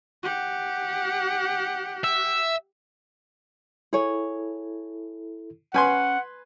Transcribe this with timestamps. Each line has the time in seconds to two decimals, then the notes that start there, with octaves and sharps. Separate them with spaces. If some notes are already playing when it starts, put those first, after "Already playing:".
0.23 G4 F#5
2.04 E5
3.93 E4 G#4 A4 C#5
5.74 C#4 B4 F#5 G#5 C6